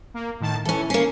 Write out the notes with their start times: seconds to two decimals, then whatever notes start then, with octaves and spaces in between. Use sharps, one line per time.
0.14 A#3
0.40 A2 D#3 A5
0.65 E3 C#4 A4
0.90 A#3 C#4 C7